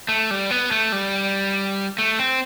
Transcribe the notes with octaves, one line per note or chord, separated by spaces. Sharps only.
A3
G3
B3
A3
G3
A3
C4